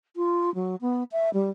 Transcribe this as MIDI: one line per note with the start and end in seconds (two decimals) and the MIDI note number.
0.16 0.53 65
0.55 0.76 54
0.81 1.03 59
1.12 1.30 76
1.34 1.50 55